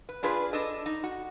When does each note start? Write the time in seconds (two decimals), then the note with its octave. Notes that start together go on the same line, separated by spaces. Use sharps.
0.09 B4
0.23 D4 F4 G#4 B4
0.53 D4 A4 D#5
0.86 D#4
1.03 F#4